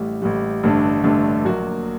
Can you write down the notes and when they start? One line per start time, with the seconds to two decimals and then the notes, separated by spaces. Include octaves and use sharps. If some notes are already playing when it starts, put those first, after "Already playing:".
Already playing: A1 A2 G3
0.21 A1 A2 G3
0.63 A1 G2 D3 A3 D4
1.03 A1 G2 D3 A3 D4
1.44 A#1 A#2 F#3 A#3 F#4